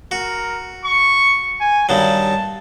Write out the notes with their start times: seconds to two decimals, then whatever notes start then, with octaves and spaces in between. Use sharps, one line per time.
0.11 F#4 A#4
0.84 C#6
1.60 G#5
1.89 G2 D#3 F#3 A5